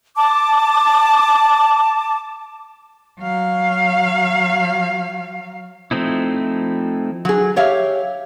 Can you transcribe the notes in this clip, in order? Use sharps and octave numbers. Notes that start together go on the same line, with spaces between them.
A5 D6
F#3 F5
F3 A3 C4 D#4 E4
F#3 G#4
G4 C#5 E5 F5